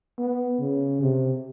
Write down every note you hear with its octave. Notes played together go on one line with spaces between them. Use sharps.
B3
C#3
C3